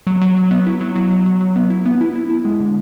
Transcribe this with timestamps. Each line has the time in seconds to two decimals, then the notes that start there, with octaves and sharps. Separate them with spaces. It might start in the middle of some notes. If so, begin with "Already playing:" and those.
0.07 F#3
0.22 F#3
0.37 F#3
0.51 B3
0.67 E4
0.81 F#3
0.95 F#3
1.10 F#3
1.26 F#3
1.41 F#3
1.56 B3
1.70 E4
1.86 B3
2.01 E4
2.16 E4
2.30 E4
2.45 G#3
2.60 D3